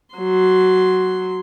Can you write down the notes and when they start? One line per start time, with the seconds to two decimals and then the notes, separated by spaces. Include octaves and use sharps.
0.15 F#3 C6